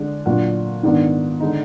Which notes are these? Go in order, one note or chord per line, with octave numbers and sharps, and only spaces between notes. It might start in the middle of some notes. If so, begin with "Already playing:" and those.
Already playing: D3 G#3 D4
A#2 F#3 D4
G#2 D#3 G#3 B3 D4
D3 G#3 D#4